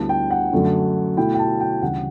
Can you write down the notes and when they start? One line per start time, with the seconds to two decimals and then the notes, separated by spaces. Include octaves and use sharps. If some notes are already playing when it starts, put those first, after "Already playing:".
Already playing: D2 D3 G3 B3 E4 A5
0.09 G5
0.30 F#5
0.52 F#2 D3 A3 D4
1.17 B2 F#3 A3 E4 G5
1.34 G5
1.39 A5
1.60 G5
1.82 D2 C#3 E3 G3 F#5